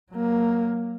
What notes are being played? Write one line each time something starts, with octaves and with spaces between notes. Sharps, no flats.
F#3 A#3